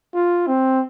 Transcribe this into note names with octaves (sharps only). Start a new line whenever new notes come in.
F4
C4